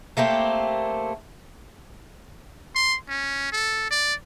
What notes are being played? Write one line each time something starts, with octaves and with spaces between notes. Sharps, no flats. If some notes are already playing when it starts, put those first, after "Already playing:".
A3 A#3 C4 G4
C6
C#4
A4
D5